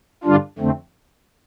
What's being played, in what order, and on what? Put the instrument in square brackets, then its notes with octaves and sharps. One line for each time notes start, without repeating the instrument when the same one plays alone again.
[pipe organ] G2 D3 G3 D4 F4
F2 D3 A3 C4